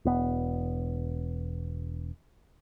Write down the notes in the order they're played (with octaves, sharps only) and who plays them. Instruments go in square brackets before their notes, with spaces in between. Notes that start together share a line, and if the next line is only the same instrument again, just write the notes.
[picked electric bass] E1 B3